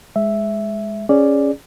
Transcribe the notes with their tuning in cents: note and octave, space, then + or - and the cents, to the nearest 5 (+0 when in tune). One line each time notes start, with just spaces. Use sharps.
G#3 +0 E5 +0
C#4 +0 G#4 -5 D5 +0